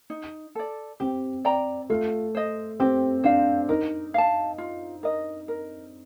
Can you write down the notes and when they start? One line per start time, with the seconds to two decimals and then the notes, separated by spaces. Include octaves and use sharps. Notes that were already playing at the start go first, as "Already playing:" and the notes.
0.10 D#4
0.55 A4 D5
1.00 C4 G4
1.45 D5 G5 A#5
1.90 A3 F4
2.35 C5 D#5
2.80 C4 G4
3.24 D4 C5 F5
3.69 D#4 A#4
4.14 F5 A5
4.58 F4
5.03 A#4 D#5
5.48 A#4